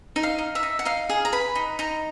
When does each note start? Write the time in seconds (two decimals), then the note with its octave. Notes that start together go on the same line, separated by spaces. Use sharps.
0.16 D#4
0.23 F5
0.38 D#4
0.55 E5
0.63 D#4
0.79 F#5
0.85 D#4 F5
1.09 G#4
1.25 A#5
1.32 B4 B5
1.55 D#4
1.79 D#4 A#5